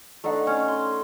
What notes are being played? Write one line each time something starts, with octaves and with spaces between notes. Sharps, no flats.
A3 D4 D#4 F#5
C#4
C6